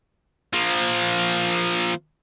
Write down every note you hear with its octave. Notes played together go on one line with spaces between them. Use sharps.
F3 A#3